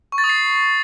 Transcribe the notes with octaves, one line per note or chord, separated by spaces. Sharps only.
C#6
A6
D#6
C7